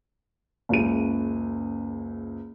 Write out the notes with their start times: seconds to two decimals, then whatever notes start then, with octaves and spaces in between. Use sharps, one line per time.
0.69 F#1 C#2 D#7